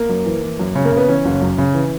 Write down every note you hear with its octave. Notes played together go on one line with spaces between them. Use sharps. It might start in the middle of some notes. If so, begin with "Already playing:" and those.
Already playing: A#3
F#2
E3
E3
F#2
C#3
A#3
C#3 B3
E3 C#4
F#1
F#2
C#3
E3